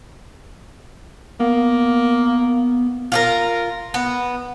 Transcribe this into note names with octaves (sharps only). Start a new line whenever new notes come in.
A#3 B3
F4 G4 A#4
B3